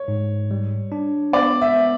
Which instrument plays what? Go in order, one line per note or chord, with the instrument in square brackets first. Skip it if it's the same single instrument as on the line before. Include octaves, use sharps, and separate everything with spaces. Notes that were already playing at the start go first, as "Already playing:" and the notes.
Already playing: [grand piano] C#5
[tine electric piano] G#2
G3
D4
[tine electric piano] B3 [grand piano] D5
[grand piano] E5
[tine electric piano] B3